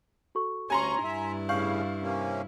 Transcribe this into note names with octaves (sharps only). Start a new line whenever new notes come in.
F#4 A4 C#6
D2 C#4 G4 G#5 A#5 C6 C#6
G2 E4 E5
A2 C#3 C#4 F5 C#6 G6 F#7
C3 A#3 C#4